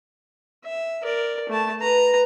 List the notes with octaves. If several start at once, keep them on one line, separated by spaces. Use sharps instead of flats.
E5
A#4 D5
A3 A5
B4 A#5